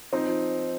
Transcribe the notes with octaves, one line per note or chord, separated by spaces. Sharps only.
F3 C4 D#4
F3